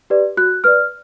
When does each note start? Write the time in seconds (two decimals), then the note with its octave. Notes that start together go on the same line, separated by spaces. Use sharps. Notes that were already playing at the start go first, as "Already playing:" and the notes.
0.10 G4 B4 D5
0.37 F#4 F#6
0.64 B4 D5 F6